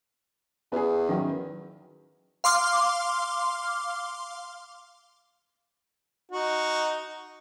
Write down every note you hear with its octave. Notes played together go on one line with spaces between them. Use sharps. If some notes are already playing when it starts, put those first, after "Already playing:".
E2 B3 G#4
D#3 F#3 C#4
F5 C6 D6 F6
D#4 F#4